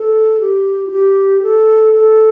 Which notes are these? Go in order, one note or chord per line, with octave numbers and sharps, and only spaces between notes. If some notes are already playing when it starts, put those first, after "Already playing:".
Already playing: A4
G4
F4
G4
A4
A4